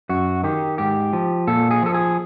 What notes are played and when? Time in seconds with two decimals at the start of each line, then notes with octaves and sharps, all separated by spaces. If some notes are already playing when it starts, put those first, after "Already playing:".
0.09 F#2 F#4
0.44 D#3 G4
0.78 G#2 G4
1.13 F3
1.47 A#2 A4
1.71 G#4
1.82 F3 A4
1.94 G#4